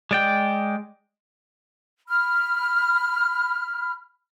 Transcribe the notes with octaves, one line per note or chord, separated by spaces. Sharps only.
G#3 D5 G5
B5 F6